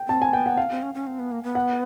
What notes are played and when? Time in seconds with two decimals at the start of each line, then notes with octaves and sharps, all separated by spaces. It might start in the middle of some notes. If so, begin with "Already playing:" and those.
Already playing: G5
0.08 C4 A5
0.22 G#5
0.33 B3 G5
0.46 F#5
0.57 C4 F5
0.70 C4
0.82 C#4
0.94 C#4
1.07 C4
1.19 B3
1.31 A#3
1.43 B3
1.55 F#5